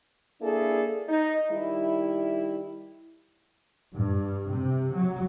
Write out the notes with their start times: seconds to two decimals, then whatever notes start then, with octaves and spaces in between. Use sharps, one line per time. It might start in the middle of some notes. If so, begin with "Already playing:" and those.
0.41 A#3 D4 E4 G#4 A4
1.09 D#4
1.51 D#3 G3 E4
3.93 G2
4.50 C3
4.93 F#3